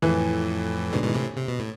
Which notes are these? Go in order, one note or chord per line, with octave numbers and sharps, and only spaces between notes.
F2 A2 E3
G#2 B2 D3
G#2 B2 E3
A2 C3
C3
B2
A2